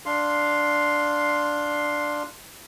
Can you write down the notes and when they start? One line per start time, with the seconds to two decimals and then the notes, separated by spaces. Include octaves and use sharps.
0.06 D4 F5 C6